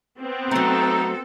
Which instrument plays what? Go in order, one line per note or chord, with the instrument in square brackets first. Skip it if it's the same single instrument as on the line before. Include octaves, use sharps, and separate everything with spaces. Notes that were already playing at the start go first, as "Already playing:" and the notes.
[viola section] B3 C4
[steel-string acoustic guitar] F#3 A3 [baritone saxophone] D#4 [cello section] A4